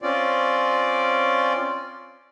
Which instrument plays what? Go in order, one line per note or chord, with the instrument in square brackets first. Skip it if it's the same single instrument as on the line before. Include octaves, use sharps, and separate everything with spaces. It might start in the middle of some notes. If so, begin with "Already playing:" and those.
[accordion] C4 C#4 F4 D5